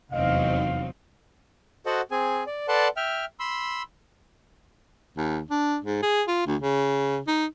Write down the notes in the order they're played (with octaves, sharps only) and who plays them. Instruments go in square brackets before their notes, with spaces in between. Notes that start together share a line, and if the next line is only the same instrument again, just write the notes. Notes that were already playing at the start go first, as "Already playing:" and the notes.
[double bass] F1 E2 [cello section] F#3 C4 D#4 [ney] D#5 [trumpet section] F5
[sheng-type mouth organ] F#4 A4 C5 D#5 F#5
C4 G#4 G#5
D5
A4 B4 D5 F#5 A5 C6
E5 G5 F6
B5 C6 E6
[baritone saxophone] D#2
D4
G#2
G#4
F4
D2
C#3
D#4